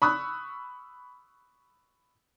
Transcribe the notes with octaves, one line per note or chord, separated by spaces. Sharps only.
B5 C#6 D#6 E6 F#6